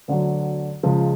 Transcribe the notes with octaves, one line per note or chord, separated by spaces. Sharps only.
D2 D3 F#3
C#2 C#3 F3 G#3